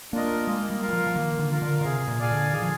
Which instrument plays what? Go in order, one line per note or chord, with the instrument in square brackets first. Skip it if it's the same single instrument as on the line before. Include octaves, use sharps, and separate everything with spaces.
[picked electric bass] A#3 [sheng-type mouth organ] D4 F4 A#4 D#5
[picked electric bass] G#3 [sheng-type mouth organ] A#3
[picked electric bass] G3
[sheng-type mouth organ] F4 A#4 F5
[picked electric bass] G3
F3
F3
[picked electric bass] D#3 [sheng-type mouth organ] A#3
[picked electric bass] D3
[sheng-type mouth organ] F4 A#4 F5
[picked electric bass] D3
D3
[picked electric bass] C3 [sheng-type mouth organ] G#4
[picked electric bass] A#2
[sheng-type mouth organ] D5 F5 G#5
[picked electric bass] D3
[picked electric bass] D#3 [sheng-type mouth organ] G#4
[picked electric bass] F3